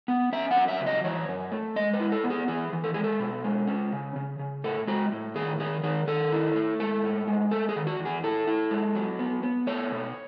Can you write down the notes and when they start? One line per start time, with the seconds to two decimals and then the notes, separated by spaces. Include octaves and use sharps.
0.08 B3
0.33 C#4 E5
0.51 F#5
0.57 F#3
0.68 E5
0.81 C#3
0.86 D#5
1.04 E3 C#5
1.28 F#2
1.52 A3
1.76 G#3 D#5
1.93 B4
2.00 E4
2.12 A4
2.24 B3
2.30 G#4
2.48 E3 G#4
2.73 E3
2.84 A4
2.94 G#3 G#4
3.04 A4
3.20 B2
3.44 G#3
3.67 C#4
3.92 C#3
4.16 C#3
4.39 C#3
4.64 A2 A4
4.87 G#3 F#4
5.12 A2
5.35 D#3 G#4
5.60 D#3 G#4
5.83 D#3 G#4
6.07 D#3 A4
6.32 E4
6.56 A3
6.80 G#3 A4
7.03 A2
7.28 G#3
7.51 A3 A4
7.69 G#4
7.76 D#3
7.87 F#4
8.00 E2
8.05 G#4
8.23 E4 A4
8.47 E4
8.71 G#3
8.95 F#3
9.19 B3
9.43 B3
9.67 A3 C#5
9.92 B2